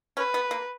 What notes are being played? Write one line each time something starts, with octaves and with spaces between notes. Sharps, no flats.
C#4 B4
B3
A#3